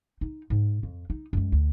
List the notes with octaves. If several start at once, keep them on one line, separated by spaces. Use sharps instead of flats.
D#4
G#2
F2
D#4
F#2 G#3
D2